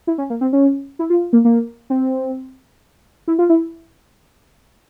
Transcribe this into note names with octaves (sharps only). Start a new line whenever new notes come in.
E4
C#4
A#3
C4
C#4
E4
F4
A#3
A#3
C4
E4
F4
E4